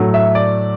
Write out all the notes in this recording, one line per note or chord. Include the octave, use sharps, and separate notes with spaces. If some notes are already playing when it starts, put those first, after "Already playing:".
Already playing: A2 F#3 A3
E5
D5